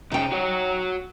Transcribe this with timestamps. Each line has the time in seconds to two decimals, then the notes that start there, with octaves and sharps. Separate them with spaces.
0.12 C3 C#4 D#4 G5
0.32 F#4 C#5